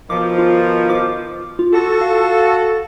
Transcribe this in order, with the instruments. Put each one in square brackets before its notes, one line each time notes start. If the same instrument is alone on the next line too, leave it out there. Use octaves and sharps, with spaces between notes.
[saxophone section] B2 D#3 F3 [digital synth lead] D6
[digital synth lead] F4
D6
F4
[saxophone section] F#4 A4
[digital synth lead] F5